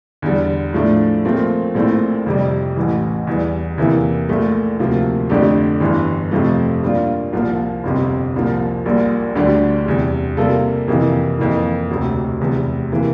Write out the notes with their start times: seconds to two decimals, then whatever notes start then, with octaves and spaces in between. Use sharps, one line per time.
0.22 E2 D3 G3
0.73 A2 F3 A3 D4
1.25 A#2 F3 A3 C4
1.75 A#1 A#2 A3 C4 E4
2.26 F2 C3 G3
2.76 A1 A2 E3
3.27 E2 E3 G3
3.78 E2 C3 E3 A#3 E4
4.29 A#1 A#2 A3
4.80 D2 C3 F3 A#3
5.30 F2 D3 A3 D4 G4
5.80 G1 G2 E3
6.31 F2 C3 F3 A3
6.83 A#2 G3 D4 F4
7.32 C2 A#2 F3 A#3
7.83 G1 F2 C3
8.34 C2 A#2 F3
8.86 A#1 A#2 G3
9.35 D2 D3 G3 D4 G4
9.86 E2 C3 G3
10.37 C3 G3 A#3 F4 A4
10.88 F2 C3 E3 A#3
11.39 F2 E3 A#3 F4
11.90 E1 D2 C3
12.40 F1 E2 C3
12.91 C3 E3 A#3